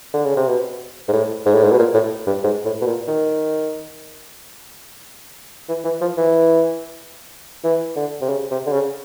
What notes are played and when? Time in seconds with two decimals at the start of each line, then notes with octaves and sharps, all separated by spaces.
0.14 D3
0.25 C#3
0.36 C3
0.48 B2
1.08 G#2
1.13 A2
1.46 G#2
1.55 A2
1.64 G#2
1.72 B2
1.79 A#2
1.94 A2
2.27 G2
2.44 G#2
2.65 A2
2.82 B2
2.87 A#2
3.08 D#3
5.69 E3
5.84 E3
6.01 F3
6.17 E3
7.64 E3
7.96 D3
8.21 C3
8.29 C#3
8.51 C3
8.66 D3
8.72 C#3